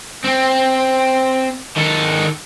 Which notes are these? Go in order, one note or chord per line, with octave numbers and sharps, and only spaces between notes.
C4
D#3 A4